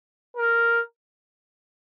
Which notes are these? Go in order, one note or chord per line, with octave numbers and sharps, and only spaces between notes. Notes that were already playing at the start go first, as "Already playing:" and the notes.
A#4